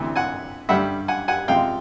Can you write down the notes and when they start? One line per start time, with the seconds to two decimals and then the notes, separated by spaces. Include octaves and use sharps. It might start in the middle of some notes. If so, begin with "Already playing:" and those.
Already playing: D2 C3 E3
0.16 F#5 G#5
0.69 G2 D3 G3 E5 F#5
1.08 F#5 G#5
1.28 F#5 G#5
1.48 F2 C3 F3 G#3 F5 G5